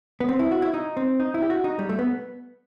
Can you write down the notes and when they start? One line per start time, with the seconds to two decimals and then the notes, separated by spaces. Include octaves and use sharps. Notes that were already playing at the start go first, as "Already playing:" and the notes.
0.20 B3
0.29 C4
0.39 E4
0.51 F#4
0.62 E4
0.74 D#4
0.97 C4
1.20 D#4
1.34 E4
1.42 G4
1.50 F#4
1.64 D#4
1.79 G3
1.89 A3
1.99 B3